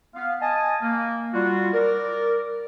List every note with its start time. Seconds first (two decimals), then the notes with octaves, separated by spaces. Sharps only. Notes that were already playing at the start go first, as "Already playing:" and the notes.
0.14 B3 F5
0.41 D#5 G#5 A5
0.82 A#3
1.33 G3 F4 F#4
1.74 A#4 D5